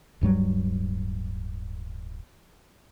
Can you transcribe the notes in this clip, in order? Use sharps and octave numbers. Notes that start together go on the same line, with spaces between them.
D1 G2 F#3 G3